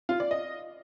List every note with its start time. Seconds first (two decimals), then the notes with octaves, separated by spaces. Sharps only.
0.09 F4
0.20 D5
0.31 D#5